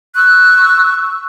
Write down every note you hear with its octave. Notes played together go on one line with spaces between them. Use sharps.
C#6 E6 F#6